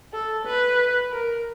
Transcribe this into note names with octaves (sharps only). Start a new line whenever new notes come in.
A4
B4
A#4